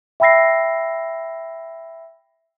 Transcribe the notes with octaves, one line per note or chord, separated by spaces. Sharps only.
E5 G5 B5 E6 A#6 C7